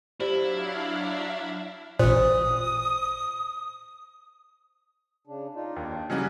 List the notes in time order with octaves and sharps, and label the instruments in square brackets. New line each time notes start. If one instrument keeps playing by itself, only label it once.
[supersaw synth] F#3 D4 F5 [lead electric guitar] E4 [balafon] G4 C5 D5
[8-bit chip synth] A1 A#2 [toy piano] C5 [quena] D#6
[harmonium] C#3 D4
D4 D#4 F4
[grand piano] D#2
[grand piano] C#3 G3 [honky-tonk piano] E3 F#3 F#4 [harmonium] D#5 G#5